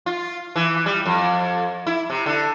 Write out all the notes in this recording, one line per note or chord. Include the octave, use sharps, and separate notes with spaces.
F4
E3
G3
F2
E4
C3
D3